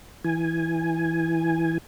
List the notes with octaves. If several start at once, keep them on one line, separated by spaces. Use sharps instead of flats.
E3 G#5